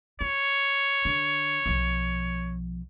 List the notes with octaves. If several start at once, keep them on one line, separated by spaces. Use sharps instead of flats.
F4 C#5
D3
B1 F3